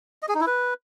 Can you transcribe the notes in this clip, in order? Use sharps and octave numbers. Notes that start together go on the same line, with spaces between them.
D#5
G#4
D#4
E4
B4